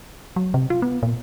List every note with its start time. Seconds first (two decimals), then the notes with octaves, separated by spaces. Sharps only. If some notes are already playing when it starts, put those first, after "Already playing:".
0.36 F#3
0.54 C3
0.70 F4
0.82 B3
1.03 A#2